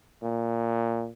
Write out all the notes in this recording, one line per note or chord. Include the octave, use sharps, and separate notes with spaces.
A#2